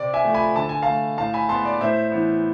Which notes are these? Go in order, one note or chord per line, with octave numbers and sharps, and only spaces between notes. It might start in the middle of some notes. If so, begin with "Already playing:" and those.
Already playing: C3 D5
E5 G#5
F3 A3
G#5 B5
D3 A5
G#5
A3 F5 A5
A2 F5 A5
G#5 B5
G#3 B3 A5 C6
D5
A2 C5 E5
E3 B3